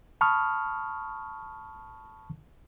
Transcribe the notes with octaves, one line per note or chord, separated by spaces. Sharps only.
A5 B5 C#6 D#6 F6